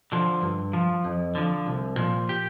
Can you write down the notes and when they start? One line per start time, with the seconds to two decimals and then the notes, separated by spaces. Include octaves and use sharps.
0.12 D3 F3
0.42 G2
0.73 F3
1.04 F2
1.35 D3 F3
1.67 C2
1.97 A#2 F3
2.29 G4